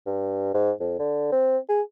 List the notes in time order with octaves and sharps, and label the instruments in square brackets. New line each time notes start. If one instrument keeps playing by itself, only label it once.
[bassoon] G2
G#2
F2
D3
C4
G#4